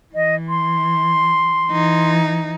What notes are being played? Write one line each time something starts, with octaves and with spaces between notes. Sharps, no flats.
E3 D#5
C6
E3 D#4